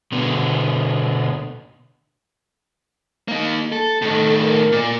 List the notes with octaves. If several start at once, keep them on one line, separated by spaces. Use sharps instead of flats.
B2 D3 B3
A#3 D#4
A4
A2 D#3 A4
A#4
A#2